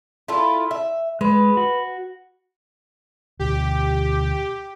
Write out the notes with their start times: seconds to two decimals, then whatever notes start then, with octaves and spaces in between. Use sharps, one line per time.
0.28 E4 F4 A4
0.71 E5
1.21 G#3 B4
1.57 F#4
3.39 D2 B2 G4